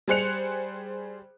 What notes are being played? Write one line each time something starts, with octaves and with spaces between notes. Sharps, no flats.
G3 G#4 C5 F#6 C#7 F7